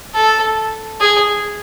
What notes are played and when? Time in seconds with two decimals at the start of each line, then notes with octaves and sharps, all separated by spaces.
0.15 A4
1.01 G#4